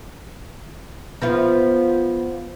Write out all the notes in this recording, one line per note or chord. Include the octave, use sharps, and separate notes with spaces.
F3 B3 F4